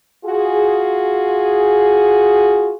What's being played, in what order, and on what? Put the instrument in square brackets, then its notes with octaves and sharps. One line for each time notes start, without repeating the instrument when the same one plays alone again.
[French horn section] F4 F#4 G#4